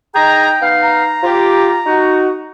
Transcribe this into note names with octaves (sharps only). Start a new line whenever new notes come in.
D#4 G#4 G5 A#5
B3 D#4 F5
A#5
F4 G4
D#4 F#4